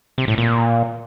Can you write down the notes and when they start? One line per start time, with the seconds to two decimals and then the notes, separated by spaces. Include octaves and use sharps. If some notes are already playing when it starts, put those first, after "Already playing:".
0.18 C3
0.28 A2
0.38 A#2